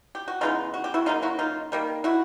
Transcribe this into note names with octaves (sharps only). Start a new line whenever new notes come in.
G4
F#4
C#3 E3 G#3 B3 D#4 F4
F#4
G4
E4 F#4
C#3 F#3 A#3 D#4 F4
E4 F#4
D#4 F4
D#3 G3 A#3
E4 F#4